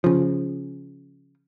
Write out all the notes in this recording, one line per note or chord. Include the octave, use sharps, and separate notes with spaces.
C#3 F3